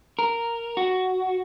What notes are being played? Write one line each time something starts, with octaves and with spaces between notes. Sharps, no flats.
A#4
F#4